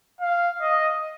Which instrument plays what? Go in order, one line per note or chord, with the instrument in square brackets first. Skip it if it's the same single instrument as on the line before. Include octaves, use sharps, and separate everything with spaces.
[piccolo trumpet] F5
D#5